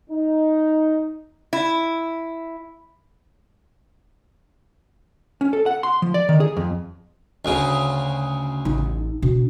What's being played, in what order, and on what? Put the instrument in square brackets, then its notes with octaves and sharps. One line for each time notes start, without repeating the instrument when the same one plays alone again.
[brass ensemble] D#4
[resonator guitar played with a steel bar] E4
[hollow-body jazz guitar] C#4
A4
F#5
C6
F3
D5
D#3
G#4
F2
[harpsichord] D2 C#3
[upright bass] A1 D#4
B2 D4